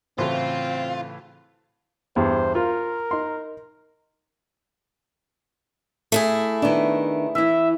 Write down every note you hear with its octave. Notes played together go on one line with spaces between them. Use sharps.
A2 C#3 E3 C4 F4 F#4 A4 C5
E2 G2 C5
F4 A#4
D#4 C6
A3 E4 G#4
D#3 B3 D4
E3 E4 E5